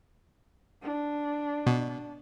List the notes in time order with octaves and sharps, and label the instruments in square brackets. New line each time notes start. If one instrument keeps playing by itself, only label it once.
[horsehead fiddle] D4
[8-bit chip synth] B2